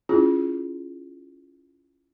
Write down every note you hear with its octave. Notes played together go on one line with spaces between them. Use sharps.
C#4 E4 F4 G#4